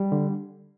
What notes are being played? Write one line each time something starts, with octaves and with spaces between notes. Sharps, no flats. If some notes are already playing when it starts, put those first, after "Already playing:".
Already playing: G3
D3